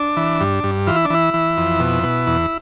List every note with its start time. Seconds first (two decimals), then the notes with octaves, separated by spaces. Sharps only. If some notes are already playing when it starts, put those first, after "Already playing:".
Already playing: D4
0.17 E3
0.40 G2
0.64 G2
0.87 E3 F4
0.96 E4
1.05 D4
1.10 E3 E4
1.34 E3
1.57 F2
1.80 B2
2.03 B2
2.27 E2